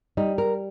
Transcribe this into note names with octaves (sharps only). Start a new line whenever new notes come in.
G3 D#4
A#4